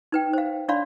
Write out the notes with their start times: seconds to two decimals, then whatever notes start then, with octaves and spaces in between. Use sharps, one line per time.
0.12 D#4 B4 G5
0.33 C5 F5
0.69 D4 C#5 D5 F5 B5 C6